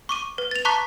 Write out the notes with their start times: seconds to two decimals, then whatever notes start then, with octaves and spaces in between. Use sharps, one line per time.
0.09 C#6 D6 D#7
0.38 B4
0.51 A6 F7
0.65 A5 A#5 C#6 D6 F#6 B6